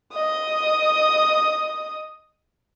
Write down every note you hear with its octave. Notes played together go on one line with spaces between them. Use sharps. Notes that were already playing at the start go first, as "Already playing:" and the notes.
D#5 D#6